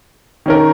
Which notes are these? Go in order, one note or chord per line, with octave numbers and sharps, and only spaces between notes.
D#3 C#4 A#4